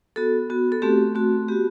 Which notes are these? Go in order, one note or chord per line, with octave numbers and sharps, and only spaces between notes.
B3 F#4 A4
B3 F#4
A4
A3 C4 F#4 G4
A3 C4 F#4
B3 F#4 G4